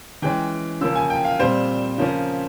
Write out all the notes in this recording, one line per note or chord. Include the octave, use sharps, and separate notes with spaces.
E3 G#3 C#4 G5
C#3 F3 A#3 C#4 E6
G#5
G5
F5
A#2 G3 C4 C5
C#3 F3 A#3 C#4